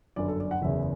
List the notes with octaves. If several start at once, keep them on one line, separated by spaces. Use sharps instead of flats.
G1 F#2 D3 D5
A4
D5
F#5
F#1 E2 C#3 E5